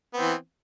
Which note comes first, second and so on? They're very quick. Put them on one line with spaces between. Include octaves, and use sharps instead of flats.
B3 C4 E3